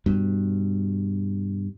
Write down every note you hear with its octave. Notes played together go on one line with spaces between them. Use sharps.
G2 B2